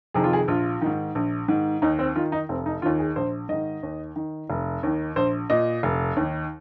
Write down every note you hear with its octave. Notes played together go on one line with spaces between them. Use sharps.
F2 C3 D#3 G#4
F4
G#4
A#1 F4
G#2 D#3
A#1
G#2 D#3
D#2 D#4
C4
D#3 F4
D#4
F1 C4
D#4
D#2 D#3 F4
G#4
A#1 C5
G#2 D#3 D#5
D#2
D#3
F1
D#2 D#3
A#1 C5
A#2 D#5
F1
D#2 D#3